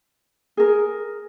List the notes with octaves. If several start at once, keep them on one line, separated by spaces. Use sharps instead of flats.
G#4 A#4